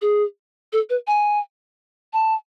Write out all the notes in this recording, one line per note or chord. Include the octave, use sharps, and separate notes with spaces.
G#4
A4
B4
G#5
A5